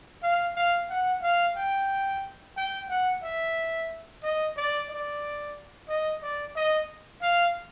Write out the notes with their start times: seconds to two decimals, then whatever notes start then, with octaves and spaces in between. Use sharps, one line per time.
0.23 F5
0.56 F5
0.89 F#5
1.22 F5
1.56 G5
2.57 G5
2.89 F#5
3.23 E5
4.23 D#5
4.57 D5
4.89 D5
5.89 D#5
6.22 D5
6.56 D#5
7.22 F5